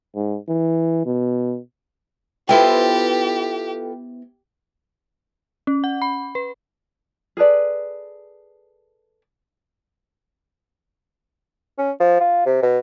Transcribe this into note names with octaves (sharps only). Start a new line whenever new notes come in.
G#2
E3
B2
B3 E4 F4 G4 A4 B4 C5 G5
C#4
F#5
B5
B4
G#4 A4 B4 D5
C#4
F3
F4
C3
B2